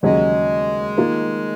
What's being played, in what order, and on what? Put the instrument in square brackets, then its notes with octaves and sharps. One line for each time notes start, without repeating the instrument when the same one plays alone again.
[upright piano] D#2 C#3 F#3 C#4 G#4 [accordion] G#3
[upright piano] D#3 A#3 F4